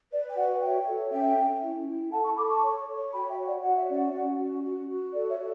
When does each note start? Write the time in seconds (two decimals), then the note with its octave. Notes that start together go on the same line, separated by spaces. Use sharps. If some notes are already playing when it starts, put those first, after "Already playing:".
0.11 B4 D5
0.30 G5
0.36 F#4 D5 F#5
0.61 C#5 E5 G5
0.86 A4
1.11 C#4 E5 G5
1.37 C#4
1.62 E4
1.87 E4
2.12 A4 F#5 A5
2.25 A5 C#6
2.37 A4 B5 D6
2.49 A5 C#6
2.62 C#5
2.87 C#5
3.13 F#4 G5 B5
3.29 E5 G5
3.38 C#5
3.45 D5 F#5
3.63 F#4 F#5
3.76 E5
3.88 C#4 D5 F#5
4.13 C#4
4.37 F#4
4.63 F#4
4.88 F#4
5.13 A4 D5
5.30 C#5 E5
5.39 F#4